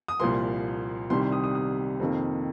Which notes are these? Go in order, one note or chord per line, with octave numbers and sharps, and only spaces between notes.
D#6
C2 A#2 F3 A#3 C6
C2 C3 D#3 G3 C6
C6
D#6
D#6
D#6
F2 C3 D#3 A#3